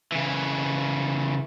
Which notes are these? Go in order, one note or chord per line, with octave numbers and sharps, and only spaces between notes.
C#3 E3